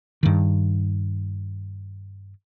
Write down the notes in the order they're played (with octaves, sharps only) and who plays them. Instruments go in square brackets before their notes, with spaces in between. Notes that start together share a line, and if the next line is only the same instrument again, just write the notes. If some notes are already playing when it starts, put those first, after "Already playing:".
[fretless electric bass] G2 D#3